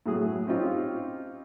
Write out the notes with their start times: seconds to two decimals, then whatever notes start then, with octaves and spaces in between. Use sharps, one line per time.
0.06 A2 F#3 G#4
0.47 C4 C#4 D#4 F4 G4